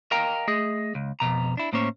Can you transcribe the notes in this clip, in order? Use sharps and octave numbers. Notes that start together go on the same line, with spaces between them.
A#4 D#5 F5 G5 A#5
A3 G#4 D#5
C#2
F2 G#2 B2 A#5
D4 E4
A2 A#3 C#4 C5 C#5